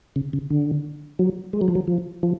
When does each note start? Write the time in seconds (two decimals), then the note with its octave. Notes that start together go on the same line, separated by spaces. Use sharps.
0.16 C#3
0.33 C#3
0.51 D3
1.19 F#3
1.53 G#3
1.61 F#3
1.68 F3
1.75 F#3
1.88 F3
2.23 F3